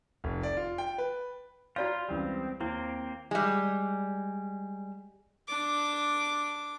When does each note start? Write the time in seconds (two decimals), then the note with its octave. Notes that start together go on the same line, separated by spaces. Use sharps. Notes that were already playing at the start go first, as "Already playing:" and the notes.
0.24 F1
0.43 D5
0.57 F4
0.78 G5
0.98 B4
1.76 F4 F#4 D5 F5 A#5 B5 G6
2.09 C#2 E3 G3 C4
2.61 D#2 A#3 C4 E4
3.31 G3 G#3
5.47 D4 D6